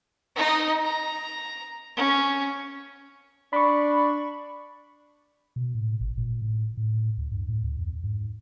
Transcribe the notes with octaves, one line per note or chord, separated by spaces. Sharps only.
D#4 D#5
A#5
C#4
D4 B5 C#6
B2
A2
G#1
A#2
A2
A2
D2
G2
A2
D2
F2
G#2